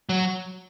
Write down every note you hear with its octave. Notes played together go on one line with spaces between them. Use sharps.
F#3